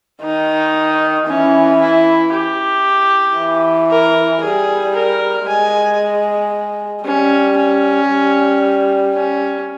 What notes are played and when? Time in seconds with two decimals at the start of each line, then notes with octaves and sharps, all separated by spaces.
0.24 D#3 D#4
1.28 E3 C#4
1.81 E4
2.34 G4
3.38 E3
3.91 A#4
4.43 G3 G#4
4.95 A#4
5.47 G#3 G#5
7.04 G3 C#4
7.57 C#4
8.09 G3
9.13 C#4